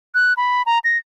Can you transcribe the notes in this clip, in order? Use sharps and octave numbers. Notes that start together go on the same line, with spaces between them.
F#6
B5
A#5
A#6